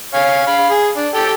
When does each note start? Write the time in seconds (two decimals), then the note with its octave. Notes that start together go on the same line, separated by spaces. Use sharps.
0.14 C#5 F5 G#5
0.47 F5 B5
0.70 G#4
0.97 D4
1.15 G4 A4 G5